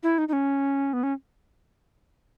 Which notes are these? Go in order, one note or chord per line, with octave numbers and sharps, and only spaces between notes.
E4
D#4
D#4
C#4
B3
C#4